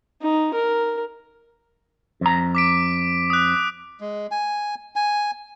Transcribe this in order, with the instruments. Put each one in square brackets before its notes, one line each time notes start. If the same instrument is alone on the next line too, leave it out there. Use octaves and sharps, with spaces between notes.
[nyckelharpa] D#4
A#4
[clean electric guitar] F2 A#5
[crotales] D6 B6 D7
D#6 F#6
[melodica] G#3
G#5
G#5